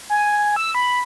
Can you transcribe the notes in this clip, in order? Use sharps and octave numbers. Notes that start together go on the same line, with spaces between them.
G#5
E6
B5